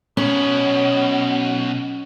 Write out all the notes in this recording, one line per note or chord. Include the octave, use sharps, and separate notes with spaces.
B1 B2 C#4